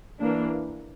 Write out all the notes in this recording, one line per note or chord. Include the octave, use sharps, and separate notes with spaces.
E3 A#3 D4